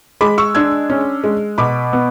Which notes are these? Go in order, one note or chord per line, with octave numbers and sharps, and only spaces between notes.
G#3 B5 D6
C#6 E6
D4 E6 G#6
C#4
G#3
B2 B5 D6
B3